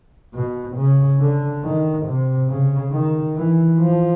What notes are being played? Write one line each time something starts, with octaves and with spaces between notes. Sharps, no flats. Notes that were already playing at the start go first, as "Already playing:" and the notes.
B2
C#3
D3
D#3
C3
C#3
D#3
E3
F3